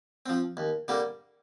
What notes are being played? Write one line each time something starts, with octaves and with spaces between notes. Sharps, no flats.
F3 C4
D#2
D3 G3 A#3